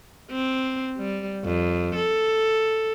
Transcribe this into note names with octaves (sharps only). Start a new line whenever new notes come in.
C4
G3
F2
A4